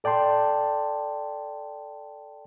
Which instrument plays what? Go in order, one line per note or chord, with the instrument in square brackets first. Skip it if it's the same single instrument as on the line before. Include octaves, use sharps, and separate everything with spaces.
[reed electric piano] A4 D5 G5 A5 C6